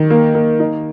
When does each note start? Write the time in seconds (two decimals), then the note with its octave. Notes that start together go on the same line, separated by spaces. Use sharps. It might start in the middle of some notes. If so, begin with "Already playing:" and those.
Already playing: D#3
0.10 A#3
0.35 A#3
0.60 D#4